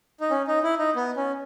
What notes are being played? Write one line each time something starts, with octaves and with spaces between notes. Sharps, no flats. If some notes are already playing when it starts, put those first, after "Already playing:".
D#4
C#4
D#4
E4
D#4
B3
C#4